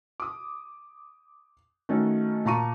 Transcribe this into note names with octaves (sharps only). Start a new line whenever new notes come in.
D6 D#6
D#3 A3 C#4 D#4 F#4
A#2 A5 A#5 C#6 D#7